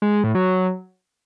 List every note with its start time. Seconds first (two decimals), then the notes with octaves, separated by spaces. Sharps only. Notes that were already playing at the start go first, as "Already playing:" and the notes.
0.02 G#3
0.13 G#3
0.24 A2
0.35 F#3